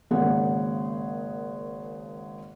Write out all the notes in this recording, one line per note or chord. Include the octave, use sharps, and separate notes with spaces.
G#1 C#3 A#3 G#4 A#4 F#5